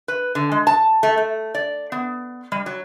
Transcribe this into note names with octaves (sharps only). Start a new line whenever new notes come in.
B4
D3
G#3
A5
A3
A3
D5
B3
G3
F#3